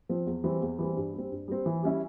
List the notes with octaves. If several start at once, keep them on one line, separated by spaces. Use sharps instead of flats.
F3 C4 F4
E2
E3 G3 C4
E2
E3 G3 C4
G2
G3
C4
G2
G3 C4
E3
G3 C#4 E4